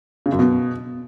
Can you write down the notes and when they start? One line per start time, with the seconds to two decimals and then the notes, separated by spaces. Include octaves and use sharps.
0.26 C#3
0.32 F#2
0.39 B2